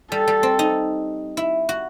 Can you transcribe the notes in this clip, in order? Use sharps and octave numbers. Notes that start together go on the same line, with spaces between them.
G3 A4
G3
C4
D#4
E4
F#4